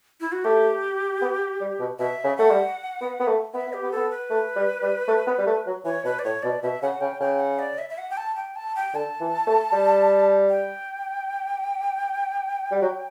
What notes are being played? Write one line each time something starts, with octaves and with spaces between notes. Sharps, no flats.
E4
F#4
A3 G4
B3
G3
B2
B2 E5
C#3
A3 F#5
G3
B3
B3
A3
B3 E5
B3
G4
B3
A4
B3
B4
A3
G3
G3
A3
B3
G3
A3
F#3
E3 C#5
B2 B4
D5
A2 C#5
B2 D5
B2 E5
C#3 F#5
C#3 G5
C#3 G5
F#5
D5
E5
E5
F#5
G5
A5
G5
A5
G5
D3 A5
E3
A3
G3
G5
G3
F#3